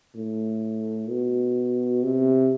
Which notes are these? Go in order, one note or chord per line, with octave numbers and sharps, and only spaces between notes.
A2
B2
C3